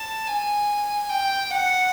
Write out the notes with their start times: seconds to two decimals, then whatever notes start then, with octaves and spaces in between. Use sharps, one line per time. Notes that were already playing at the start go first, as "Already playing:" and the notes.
Already playing: A5
0.28 G#5
1.09 G5
1.50 F#5